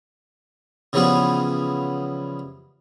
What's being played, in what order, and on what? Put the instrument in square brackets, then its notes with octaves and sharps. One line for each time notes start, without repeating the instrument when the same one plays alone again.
[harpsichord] C#3 E3 F3 G3 B3 G#4